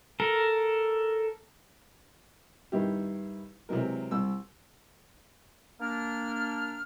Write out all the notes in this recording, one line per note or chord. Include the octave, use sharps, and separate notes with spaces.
A4 A#4
G2 D#3 D#4 E4 G4
C3 E3 F#3 G#3 A#4
C2 E6
A#3 D4 F6